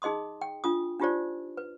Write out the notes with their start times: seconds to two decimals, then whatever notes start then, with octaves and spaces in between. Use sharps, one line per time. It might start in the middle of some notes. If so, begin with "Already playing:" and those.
0.02 D#4 G#4 D#5 C6 D#6
0.41 G5
0.64 D4 F4 D#6
1.00 D4 D#4 F4 G4 C5 D5
1.57 B4